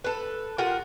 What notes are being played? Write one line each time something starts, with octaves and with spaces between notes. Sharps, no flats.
A4 B4
F4 G4 A#4 F#5